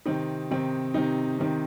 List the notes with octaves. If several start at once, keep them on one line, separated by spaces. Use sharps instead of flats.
C3 D#3 C4 D#4
C3 D#3 C4 D#4
C3 D#3 C4 D#4
C3 D#3 C4 D#4